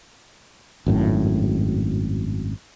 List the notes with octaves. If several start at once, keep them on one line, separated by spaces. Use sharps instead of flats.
G#1 F#2 A2